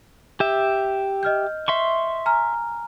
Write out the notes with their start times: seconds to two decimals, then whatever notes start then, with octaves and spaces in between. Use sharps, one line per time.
0.40 G4 E5
1.23 D#5 F6 G6
1.68 E5 C6 C#6
2.26 G#5 A#5 F6